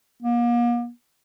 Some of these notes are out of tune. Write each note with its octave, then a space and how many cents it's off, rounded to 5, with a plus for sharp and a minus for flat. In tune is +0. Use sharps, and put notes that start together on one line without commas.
A#3 +40